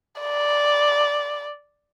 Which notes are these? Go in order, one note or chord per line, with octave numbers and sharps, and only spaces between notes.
D5